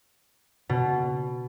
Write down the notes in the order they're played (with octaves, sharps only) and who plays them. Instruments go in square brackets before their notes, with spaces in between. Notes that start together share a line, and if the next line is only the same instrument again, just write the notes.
[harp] B2